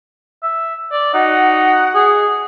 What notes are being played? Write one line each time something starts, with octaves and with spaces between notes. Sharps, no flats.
E5
D5
D#4 F#4 D#5 F#5
G#4